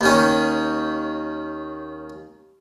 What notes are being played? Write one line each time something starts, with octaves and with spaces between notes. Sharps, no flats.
D#2 D#3 C#4